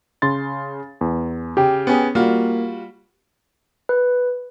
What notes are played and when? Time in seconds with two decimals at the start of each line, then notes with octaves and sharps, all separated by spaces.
0.22 C#3 C6 A6
1.01 E2
1.57 C#3 G4 G5
1.87 B3 C#4 G#4
2.15 G3 A#3 F4 F#4
3.89 B4